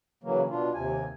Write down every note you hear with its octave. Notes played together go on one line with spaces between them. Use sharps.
C#3 E3 F#3 A#3
B2 D4 F4
D#2 C3 G#5